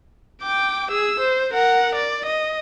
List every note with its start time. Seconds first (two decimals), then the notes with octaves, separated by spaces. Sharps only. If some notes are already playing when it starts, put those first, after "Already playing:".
0.42 G5 D6
0.91 G#4 E6
1.20 C5
1.54 A#4 F#5
1.95 D5
2.26 D#5